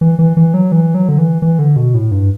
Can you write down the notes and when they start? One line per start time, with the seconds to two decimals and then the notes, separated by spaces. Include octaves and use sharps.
0.01 E3
0.19 E3
0.37 E3
0.54 F#3
0.72 E3
0.94 F#3
1.09 D3
1.18 E3
1.42 E3
1.59 D3
1.76 B2
1.94 A2
2.11 G2